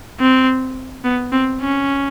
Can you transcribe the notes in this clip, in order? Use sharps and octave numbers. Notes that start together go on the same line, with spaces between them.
C4
B3
C4
C#4